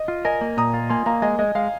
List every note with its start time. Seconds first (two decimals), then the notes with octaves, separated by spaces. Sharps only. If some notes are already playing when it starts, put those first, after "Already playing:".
Already playing: D#5
0.08 F4
0.25 A#4 D#5 G#5
0.41 A#3
0.57 A#2 A#5 D#6
0.74 F4
0.89 A#3 G#5 C6
1.06 A#3 F5 A#5
1.22 G#3 D#5 G#5
1.39 G#3 D#5
1.55 G#3 F5